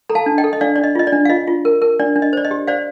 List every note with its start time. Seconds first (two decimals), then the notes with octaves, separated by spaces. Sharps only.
0.09 A4 A#5
0.15 F5 A5
0.26 D4
0.38 D#5 G5
0.44 A4
0.53 D#5
0.61 D4 D5 F5
0.76 D4 D5
0.84 D#5
0.95 F4 D#5
1.07 D5
1.13 D4
1.25 F5
1.29 F4 D#5
1.47 F4
1.65 A#4
1.82 A#4
2.00 D4 D5
2.16 D4
2.22 D#5
2.33 C5 D5
2.45 D#5
2.51 G4
2.67 C5 D5 F5